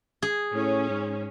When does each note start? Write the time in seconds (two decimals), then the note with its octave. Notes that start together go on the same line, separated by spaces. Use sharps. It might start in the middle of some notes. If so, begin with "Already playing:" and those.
0.22 G#4
0.54 A2 C#4
0.89 G#2